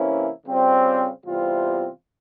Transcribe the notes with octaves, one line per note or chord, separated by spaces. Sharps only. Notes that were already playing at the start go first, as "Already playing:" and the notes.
Already playing: C3 E3 A#3 C#4 E4
C#3 G3 C4 F4
E2 C3 G3 C4 F4